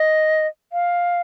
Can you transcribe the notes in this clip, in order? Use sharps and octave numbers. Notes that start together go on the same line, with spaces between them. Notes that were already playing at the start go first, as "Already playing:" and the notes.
Already playing: D#5
F5